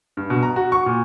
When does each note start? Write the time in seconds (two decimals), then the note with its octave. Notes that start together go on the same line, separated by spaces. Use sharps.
0.17 G2
0.30 B2
0.43 A#5
0.56 F#4
0.72 C#6
0.86 A#2